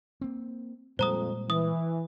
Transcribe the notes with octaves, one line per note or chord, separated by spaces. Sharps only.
A#3 C4
F2 A#2 G3 G#3 C5 A#5 D#6
E3 D#6